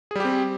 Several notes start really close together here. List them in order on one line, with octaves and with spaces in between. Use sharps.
G#4 G3 G4 C4